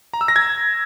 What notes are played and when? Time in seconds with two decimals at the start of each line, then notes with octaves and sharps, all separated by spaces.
0.13 A#5
0.21 E6
0.28 A#6
0.36 G#6